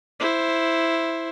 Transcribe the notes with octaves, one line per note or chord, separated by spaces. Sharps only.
E4 C5